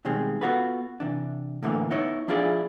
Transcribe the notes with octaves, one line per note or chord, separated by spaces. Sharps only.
B2 D#3 G3 G#3 C4
B3 C4 F4 F#4 A4 B4
C3 E3 D4
A2 D3 E3 G#3 A#3
B3 D#4 E4 C#5
F3 D4 E4 F4 G#4 D5